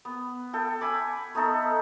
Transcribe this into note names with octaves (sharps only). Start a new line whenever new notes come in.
B3
A4 G5
G#5 B5 D6
A3 B3 D#4 A4